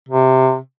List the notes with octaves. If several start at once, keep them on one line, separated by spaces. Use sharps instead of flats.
C3